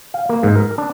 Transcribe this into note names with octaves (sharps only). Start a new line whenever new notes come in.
F5
A#3
G#2
A#4
D4